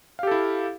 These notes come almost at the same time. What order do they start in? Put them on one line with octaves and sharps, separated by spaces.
F5 G4 A4 E4